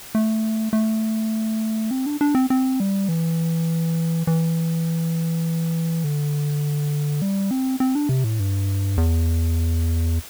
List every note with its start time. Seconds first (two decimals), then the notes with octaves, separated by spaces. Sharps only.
0.15 A3
0.73 A3
1.91 C4
2.06 D4
2.21 D4
2.35 C4
2.50 C4
2.80 G3
3.09 E3
4.27 E3
6.04 D3
7.22 G3
7.51 C4
7.80 C4
7.95 D4
8.09 C3
8.24 A2
8.39 G2
8.97 E2